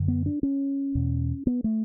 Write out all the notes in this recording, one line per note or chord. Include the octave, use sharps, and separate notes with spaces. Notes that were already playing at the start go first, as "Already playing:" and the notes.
Already playing: F#2 D3
B3
D4
C#4
E2 B2
B3
A3